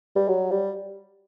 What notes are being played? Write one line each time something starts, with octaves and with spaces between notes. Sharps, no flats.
G3
F#3
G3